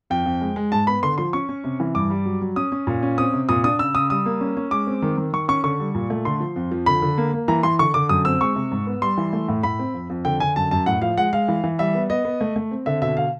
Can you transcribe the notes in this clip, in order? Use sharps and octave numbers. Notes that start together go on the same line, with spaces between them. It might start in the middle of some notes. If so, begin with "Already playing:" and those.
F2 G5
F2
G#3
G#3
G#2 A5
B3 B5
D3 C6
F3 C6
C#4 C#6
C#4
C3
E3
G2 D6
G3
F#3
F#3
C#4 D#6
C#4
A#2
C#4
C4 D#6
C3
A#2 D#6
D4 D#6
C#3 E6
C#3 D#6
G3 D#6
A#3
C#4
C#4
G#3 D6
C4
D#3
D#3
D#3 C#6
C#4 C#6
D3 C#6
G3
A#2
A3
D3 C6
F3
F2
F3
D3 B5
D3
A#3
A#3
E3 A#5
E3 C6
D3 C#6
D3 D6
F#2 D#6
C4 E6
G#3 C#6
C3
G#2
B3
G3 C6
E3
A3
A2
A2 B5
C4
F2
F2
D3 G5
D3 G#5
F#2 A5
F#2 A5
A2 F#5
F3 F5
G#3 F#5
G#3 F5
E3
E3
G3 E5
B3
B3 D#5
B3
A3
A3
C4
D3 E5
B2 E5
F5